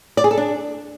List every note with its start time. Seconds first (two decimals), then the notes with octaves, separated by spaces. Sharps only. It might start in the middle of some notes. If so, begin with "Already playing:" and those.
0.17 D5
0.24 G#4
0.31 A4
0.37 D4